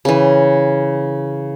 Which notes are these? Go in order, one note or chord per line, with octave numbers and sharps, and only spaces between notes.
C#3 E3